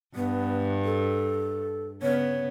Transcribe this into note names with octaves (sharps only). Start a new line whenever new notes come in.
G2 B3
A4
C#3 B3 C#5